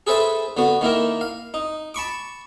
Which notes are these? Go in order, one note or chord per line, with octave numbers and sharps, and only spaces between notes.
G#4 A4 B4 C5 E5
D3 B3 F#4
D#3 A#3 E4 A#4
F5
D#4
A5 B5 C#6 D6